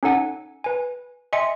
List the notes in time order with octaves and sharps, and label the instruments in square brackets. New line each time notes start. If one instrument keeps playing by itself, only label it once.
[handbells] C#4 D#4 A4 F#5 G#5
B4 G#5
D#5 E5 G5 G#5 C6 C#7